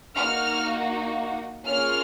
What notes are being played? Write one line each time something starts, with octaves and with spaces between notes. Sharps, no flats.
A#3 D#4 F#4 F6
A#3 C#4 F4 G#4 F6